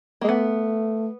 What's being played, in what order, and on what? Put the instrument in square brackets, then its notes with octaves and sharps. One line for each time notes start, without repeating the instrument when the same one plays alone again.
[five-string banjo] A#3
[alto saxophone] G#3
[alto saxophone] A3 [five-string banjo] B3